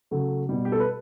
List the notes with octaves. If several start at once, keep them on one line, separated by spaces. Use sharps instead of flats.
C#3 F#3 A3
B2 G3
G4
A4
B4